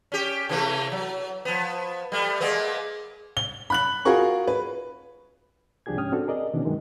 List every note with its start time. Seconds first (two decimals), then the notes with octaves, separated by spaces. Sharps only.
0.12 C#4 G4
0.49 C3 E3 A3
0.92 F#3
1.45 F3 B3
2.12 G3 A3
2.41 G#3 A#3 B3
3.37 G7
3.70 B5 F#6 F#7
4.05 F4 F#4 G#4 A#4 C#6
4.47 B4
5.86 C2 F3 D4 G4 G#4 G#6
5.97 G#2 C#4 G5 D#6 F6
6.12 C4 D4 F#4 A4
6.27 G#4 A#4 D5 D#5
6.54 B2 D#3 E3 C#4 D4
6.65 G2 D#3 E3 F#3 G#3